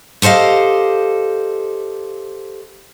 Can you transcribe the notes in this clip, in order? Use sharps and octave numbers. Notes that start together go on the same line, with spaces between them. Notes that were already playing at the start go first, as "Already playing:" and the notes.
G4 A4 C5 D#5 F5